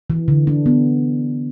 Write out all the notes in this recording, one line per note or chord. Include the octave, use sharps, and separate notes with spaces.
E3
D3
D4
B3